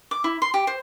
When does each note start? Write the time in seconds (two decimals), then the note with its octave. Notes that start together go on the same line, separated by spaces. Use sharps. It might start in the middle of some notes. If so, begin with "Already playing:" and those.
0.11 D6
0.24 E4
0.42 C6
0.54 G4
0.67 C5